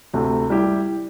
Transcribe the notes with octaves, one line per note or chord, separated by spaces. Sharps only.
D2 C3 A3
G3 E4 G4